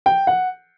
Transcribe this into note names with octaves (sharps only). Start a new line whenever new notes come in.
G5
F#5